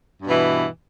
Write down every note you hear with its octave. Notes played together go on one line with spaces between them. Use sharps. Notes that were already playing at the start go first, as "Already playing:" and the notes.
G2 B2 E3